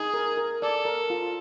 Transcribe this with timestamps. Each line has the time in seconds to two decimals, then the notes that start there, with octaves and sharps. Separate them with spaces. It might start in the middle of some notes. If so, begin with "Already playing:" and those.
Already playing: D#4 G#4
0.14 A#4
0.37 A#4
0.62 A4 D5
0.85 A#4
1.10 F4